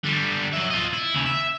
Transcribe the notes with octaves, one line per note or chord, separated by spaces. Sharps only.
D3 G3
F#3 E5
F4 D#5
E4
D#2 C#3
E5